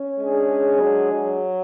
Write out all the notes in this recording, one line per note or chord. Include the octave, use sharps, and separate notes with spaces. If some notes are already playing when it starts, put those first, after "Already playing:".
Already playing: C#4
G#3 D4 G#4
F#3
F#3